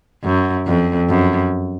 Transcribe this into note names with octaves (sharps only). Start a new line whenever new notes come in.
F#2
F2
F#2